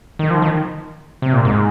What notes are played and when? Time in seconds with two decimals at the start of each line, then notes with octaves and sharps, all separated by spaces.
0.19 D#3
0.30 F3
0.42 D#3
1.22 C3
1.33 A#2
1.45 G#2